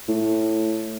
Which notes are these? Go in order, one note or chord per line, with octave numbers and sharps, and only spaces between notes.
A2